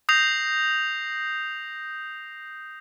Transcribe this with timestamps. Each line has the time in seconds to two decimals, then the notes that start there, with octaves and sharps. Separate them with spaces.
0.09 D#6 G6 A#6 C7 F7